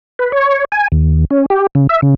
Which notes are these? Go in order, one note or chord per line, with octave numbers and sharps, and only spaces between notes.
B4
C#5
G#5
D#2
C#4
G4
C#3
E5
C#3